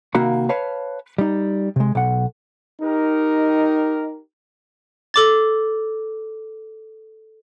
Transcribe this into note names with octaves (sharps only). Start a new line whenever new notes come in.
C3 D#3 A#3 F#4 F5 B5
B4 C#5 F5 A5 B5
G3 D#4
C3 G#3
B1 F#5
D#4 G4 A#4
A4 D6 A6